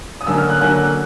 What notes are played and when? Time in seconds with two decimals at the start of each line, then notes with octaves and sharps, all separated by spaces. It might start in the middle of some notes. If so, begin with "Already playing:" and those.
0.21 D#6
0.27 D3 F#3 A#3 C#4 E6
0.38 F6
0.49 F#6
0.61 D3 F#3 A#3 C#4 F#6